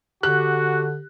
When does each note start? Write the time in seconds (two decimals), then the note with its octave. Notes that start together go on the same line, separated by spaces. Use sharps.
0.23 D3 F#4 G4 F#6